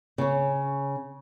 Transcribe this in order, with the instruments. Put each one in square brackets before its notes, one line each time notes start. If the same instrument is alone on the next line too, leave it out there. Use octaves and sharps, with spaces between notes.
[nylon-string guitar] C#3 C#4